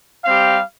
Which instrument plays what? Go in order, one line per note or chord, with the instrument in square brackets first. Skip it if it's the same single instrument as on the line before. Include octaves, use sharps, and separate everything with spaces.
[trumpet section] G3 C4 G4 F5